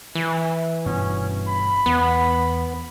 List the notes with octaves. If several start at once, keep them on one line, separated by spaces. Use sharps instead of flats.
E3
G1 G2 B2 C#4
B5
E2 B3